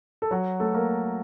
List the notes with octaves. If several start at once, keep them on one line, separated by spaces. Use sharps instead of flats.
A4
F#3 F#4
A3 A4
A#3 A#4